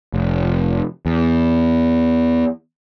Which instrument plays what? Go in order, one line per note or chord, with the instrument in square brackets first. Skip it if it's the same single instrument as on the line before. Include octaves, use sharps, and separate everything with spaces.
[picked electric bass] F1
E2